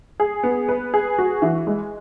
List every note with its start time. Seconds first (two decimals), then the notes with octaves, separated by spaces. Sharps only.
0.20 G#4
0.43 B3
0.69 B4
0.94 G#4
1.18 F#4
1.42 E3
1.67 G#3